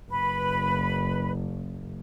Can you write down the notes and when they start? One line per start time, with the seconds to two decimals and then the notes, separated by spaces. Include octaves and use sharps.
0.10 F#1 B4 B5